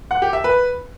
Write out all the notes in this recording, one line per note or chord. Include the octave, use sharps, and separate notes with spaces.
F#5
G4
E5
B4